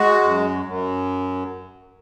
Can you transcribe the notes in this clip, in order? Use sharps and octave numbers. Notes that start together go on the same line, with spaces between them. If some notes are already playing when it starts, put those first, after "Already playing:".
Already playing: G#3 F#4
F#2
F#2